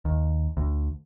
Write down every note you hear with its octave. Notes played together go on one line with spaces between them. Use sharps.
D#2
D2